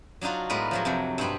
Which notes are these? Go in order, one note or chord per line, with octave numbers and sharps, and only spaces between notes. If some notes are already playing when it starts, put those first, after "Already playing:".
F#3 D4 D#4 F4 F#4
A2 G#3 B3 A#4 B4
F3 F#3 G#3
F2 C3 F#3
G2 B2 B3 C4